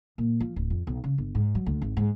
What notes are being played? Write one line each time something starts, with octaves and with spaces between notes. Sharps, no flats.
A#2
F3
D1
F2
B1
C#3
G1
G#2
F#3
D2
G#1
G#2